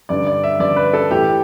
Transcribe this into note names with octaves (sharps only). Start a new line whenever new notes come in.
G2 D3 D5
D5
E5
G2 D3 D5
B4
A4
A2 E3 G4